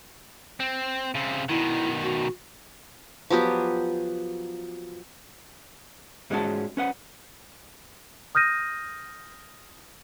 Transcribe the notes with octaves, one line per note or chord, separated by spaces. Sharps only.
C4
C#3 C4
B2 D#3 E4
F#4
F3 F#3 B3 G4
G#2 G3 G#3 C#4 F#4 A5
C#4 B4 F#5
D#6 F6 G6 A#6 D#7